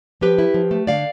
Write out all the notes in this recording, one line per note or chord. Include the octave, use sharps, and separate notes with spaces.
F3 G4 B4
E4
F3
A3
D3 D5 F5